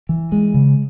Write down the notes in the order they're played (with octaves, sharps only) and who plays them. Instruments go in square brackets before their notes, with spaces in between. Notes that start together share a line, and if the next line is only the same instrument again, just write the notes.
[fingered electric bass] E3
G#3
C#3